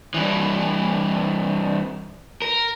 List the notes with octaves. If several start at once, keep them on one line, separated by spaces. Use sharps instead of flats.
G2 E3
A#4